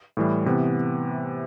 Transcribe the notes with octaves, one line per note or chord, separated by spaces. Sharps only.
A2 E3 G3
C3 E3 B3